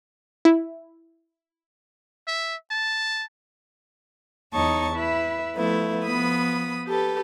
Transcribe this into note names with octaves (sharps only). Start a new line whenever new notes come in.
E4
E5
A5
E2 D#4 C#5 D#5 A5 C#6
E4 B4 E5
F3 A3 B3 E4
F3 B3 B5 D#6
G4 A4 B4